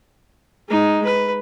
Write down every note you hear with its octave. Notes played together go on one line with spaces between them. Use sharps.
G#3 D#4
B4